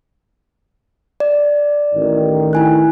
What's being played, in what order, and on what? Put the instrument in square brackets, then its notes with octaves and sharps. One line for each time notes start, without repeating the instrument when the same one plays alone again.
[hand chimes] D5
[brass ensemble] A1 D#3
[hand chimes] E4 G#5 F#6